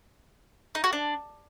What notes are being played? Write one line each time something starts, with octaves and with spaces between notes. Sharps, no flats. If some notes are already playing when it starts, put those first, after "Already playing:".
D#4
F#4
D4